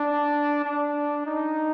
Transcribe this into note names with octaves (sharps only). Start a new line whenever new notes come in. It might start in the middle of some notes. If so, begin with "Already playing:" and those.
Already playing: D4
D4
D#4